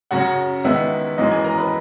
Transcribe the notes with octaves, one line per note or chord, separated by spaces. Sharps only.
F#2 C#3 F#3 C#4 F#4 F#5
E2 D#3 G#3 B3 E5
F#2 E3 G#3 B3 D#5
G#4 G#5
A#4 A#5
B4 B5